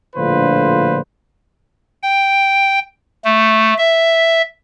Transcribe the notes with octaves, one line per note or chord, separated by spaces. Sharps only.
A#1 A2 D3 F4 B4 C5
G5
A3
E5